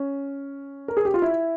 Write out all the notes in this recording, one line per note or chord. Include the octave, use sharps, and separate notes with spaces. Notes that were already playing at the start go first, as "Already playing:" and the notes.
Already playing: C#4
A#4
G#4
G4
F4
E4